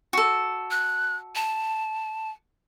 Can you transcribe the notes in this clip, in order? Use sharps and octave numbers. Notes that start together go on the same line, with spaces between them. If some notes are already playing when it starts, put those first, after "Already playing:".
F#4 A4
F#6
A5